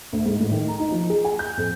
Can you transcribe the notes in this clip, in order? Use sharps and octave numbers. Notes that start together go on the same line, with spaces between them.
D2
G#2
A1
D#3
A#5
D#4
F3
G#4
G#5
G6
F2